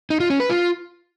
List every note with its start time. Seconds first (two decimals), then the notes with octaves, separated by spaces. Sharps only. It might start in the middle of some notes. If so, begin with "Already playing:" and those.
0.10 D#4
0.20 F4
0.30 C#4
0.40 B4
0.50 F4